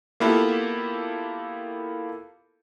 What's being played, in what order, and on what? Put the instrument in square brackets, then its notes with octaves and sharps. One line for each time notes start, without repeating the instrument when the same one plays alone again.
[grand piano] A#3 B3 E4 F4 G4 A4